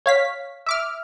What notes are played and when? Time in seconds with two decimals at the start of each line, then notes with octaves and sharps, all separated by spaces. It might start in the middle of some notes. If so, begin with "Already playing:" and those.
0.06 C#5 F5 B6
0.66 E5 D6 F6